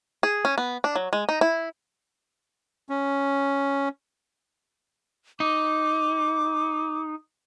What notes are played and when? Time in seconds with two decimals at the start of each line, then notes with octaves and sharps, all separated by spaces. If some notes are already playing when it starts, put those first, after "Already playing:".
0.23 G#4
0.45 C#4
0.58 B3
0.84 D4
0.96 F#3
1.13 G#3
1.29 D#4
1.41 E4
2.89 C#4
5.40 D#4 D6